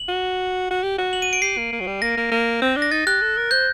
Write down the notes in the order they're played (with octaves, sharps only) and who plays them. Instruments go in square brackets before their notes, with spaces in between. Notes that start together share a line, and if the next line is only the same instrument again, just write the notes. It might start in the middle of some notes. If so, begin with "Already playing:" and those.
Already playing: [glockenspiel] F#7
[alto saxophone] F#4
F#4
G4
F#4
[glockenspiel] F#7
D#7
D7
[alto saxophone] G4 [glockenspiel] C7
[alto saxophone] A#3
A#3
F#3
G3
[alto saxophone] A#3 [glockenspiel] A#6
[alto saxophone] A#3
A#3
C4
D4
[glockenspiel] A#6
[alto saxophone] D#4 [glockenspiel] A6
[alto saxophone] G4 [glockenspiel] F#6
[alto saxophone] A4
A#4
[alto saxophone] C5 [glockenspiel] G6